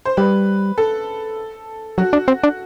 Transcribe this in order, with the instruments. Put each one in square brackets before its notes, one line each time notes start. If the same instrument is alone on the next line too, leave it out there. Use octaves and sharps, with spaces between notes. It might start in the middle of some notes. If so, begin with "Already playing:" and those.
[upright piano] C5
[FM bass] G3 [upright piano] B4
[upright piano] A4
[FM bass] F#3 [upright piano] F#4
[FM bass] D4
C4
D4